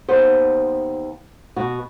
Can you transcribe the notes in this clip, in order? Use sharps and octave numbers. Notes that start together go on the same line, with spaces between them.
D#2 B3 C5
B2 F#4